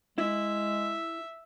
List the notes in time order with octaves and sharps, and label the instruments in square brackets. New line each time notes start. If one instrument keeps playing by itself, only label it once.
[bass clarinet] G#3 [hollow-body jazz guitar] E4 [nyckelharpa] E5